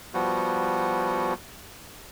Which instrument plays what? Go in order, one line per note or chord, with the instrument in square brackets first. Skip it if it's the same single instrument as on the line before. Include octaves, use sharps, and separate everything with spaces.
[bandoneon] F3 G3 B3 F#4